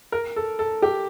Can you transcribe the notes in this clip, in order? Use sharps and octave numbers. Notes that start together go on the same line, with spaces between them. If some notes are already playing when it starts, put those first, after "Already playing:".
A#4
A4
A4
G4